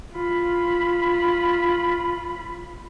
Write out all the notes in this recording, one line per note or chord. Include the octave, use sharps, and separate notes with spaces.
F4 B5